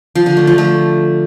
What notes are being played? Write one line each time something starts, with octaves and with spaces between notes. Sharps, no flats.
F3
D3
A3
F3
A3